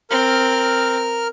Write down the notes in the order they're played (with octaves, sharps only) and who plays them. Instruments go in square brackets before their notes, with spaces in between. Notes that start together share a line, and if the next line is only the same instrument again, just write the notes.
[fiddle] C4 [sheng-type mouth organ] A#4 F6